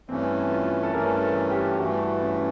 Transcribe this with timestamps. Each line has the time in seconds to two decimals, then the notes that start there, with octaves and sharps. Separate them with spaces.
0.09 G2 E3 A3 C4 C#4
0.51 F4
0.83 A4
0.93 G2 E3 A3 C#4 A#4
1.22 A4
1.51 G4
1.79 G2 E3 A3 F#4
2.22 C#4